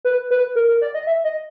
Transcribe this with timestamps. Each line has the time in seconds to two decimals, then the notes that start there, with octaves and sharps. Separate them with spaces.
0.05 B4
0.31 B4
0.56 A#4
0.69 A#4
0.81 D5
0.94 D#5
1.07 E5
1.24 D#5